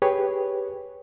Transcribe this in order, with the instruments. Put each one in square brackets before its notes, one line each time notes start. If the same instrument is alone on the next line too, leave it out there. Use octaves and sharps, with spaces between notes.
[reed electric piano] G4 G#4 B4 C#5 G5